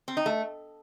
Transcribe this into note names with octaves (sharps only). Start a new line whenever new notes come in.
C4
D#4
A3